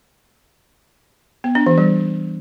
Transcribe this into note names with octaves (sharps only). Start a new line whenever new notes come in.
B3
D4
E3
G3